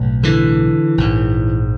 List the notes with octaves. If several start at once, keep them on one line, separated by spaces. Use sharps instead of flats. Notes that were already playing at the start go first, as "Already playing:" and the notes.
Already playing: B1 A2
D3 E3
A#1 G#2